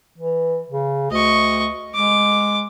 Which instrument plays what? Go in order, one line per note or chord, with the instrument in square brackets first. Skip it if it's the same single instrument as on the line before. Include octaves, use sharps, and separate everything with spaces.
[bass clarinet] E3
C#3
[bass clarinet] D2 [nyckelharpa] D#5 C#6
[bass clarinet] G#3 [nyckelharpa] D6